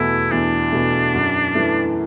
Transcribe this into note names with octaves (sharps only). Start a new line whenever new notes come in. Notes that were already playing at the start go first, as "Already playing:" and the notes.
Already playing: E2 B2 A3 E4
E2 D4
B2 A3
F#2
E3 A3